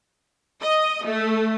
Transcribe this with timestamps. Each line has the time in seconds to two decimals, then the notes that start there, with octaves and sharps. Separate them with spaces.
0.62 D#5
1.06 A3